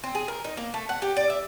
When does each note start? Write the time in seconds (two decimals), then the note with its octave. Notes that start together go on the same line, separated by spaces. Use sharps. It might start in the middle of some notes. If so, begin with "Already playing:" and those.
0.04 C4
0.15 G#4
0.28 A#4
0.44 D#4
0.57 A#3
0.74 A3
0.89 F#5
1.02 G4
1.17 D5
1.30 E5